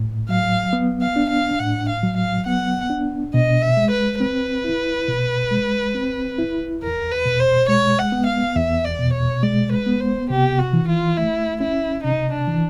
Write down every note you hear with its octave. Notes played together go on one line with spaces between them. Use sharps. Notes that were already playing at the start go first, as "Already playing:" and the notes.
Already playing: A2
F#3 F5
B3
F5
D4
F5
A2 F#5
F5
F#3
F5
B3 F#5
D4
B2 D#5
E5
G#3
B4
C4 B4
E4
B2
G#3
C4
E4
E2 A#4
B4
B2
C5
G#3 C#5
F#5
B3
F5
E2 E5
D5
B2
C#5
G#3 D5
B4
B3
C5
C3 G4
F#4
E3
F4
A3 E4
C#4 E4
C3 D#4
D4
E3